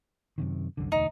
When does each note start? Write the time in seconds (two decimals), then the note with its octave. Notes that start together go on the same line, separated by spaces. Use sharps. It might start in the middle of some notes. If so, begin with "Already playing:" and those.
0.38 F#2 C3 D#3
0.77 C2 F#2 D3
0.92 E1 D2 D#4